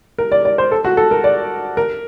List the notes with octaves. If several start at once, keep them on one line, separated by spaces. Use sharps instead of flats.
A#4
D5
D5
C5
A4
F#4
A4
A#4
D5
A#4